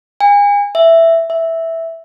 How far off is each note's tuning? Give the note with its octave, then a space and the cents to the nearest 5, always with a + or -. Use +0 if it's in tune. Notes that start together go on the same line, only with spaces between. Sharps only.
G#5 -35
E5 +5
E5 -5